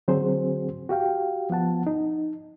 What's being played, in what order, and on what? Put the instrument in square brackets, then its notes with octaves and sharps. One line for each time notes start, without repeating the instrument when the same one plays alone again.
[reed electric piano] D3 F#3 C4 F#4 G#4 C5
F#4 G4 F5 G5
F3 B3 F#5 A5
D#4